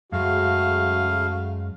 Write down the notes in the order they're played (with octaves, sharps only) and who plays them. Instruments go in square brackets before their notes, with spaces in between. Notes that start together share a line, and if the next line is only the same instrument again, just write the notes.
[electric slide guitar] F#2 G#3 [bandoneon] C#3 A3 F5 [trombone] F#4